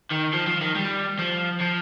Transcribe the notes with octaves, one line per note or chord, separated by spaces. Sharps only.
D#3
F3
F3
D#3
G3
F3
F3